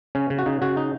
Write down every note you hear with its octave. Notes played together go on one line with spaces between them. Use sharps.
C#3 C#4
C#3
F#4
C#3 D#4
C#3 F#4
D#4